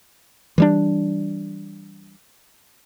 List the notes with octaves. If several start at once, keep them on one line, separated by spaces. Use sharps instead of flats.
E3 G3 D4